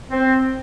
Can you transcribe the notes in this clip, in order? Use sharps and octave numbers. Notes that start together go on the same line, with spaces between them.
C4